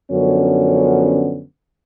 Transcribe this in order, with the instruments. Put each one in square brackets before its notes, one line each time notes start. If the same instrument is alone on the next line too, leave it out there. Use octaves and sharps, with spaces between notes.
[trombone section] F#2 D3 F3 B3 C#4